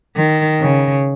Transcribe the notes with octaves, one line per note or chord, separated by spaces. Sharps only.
D#3
C#3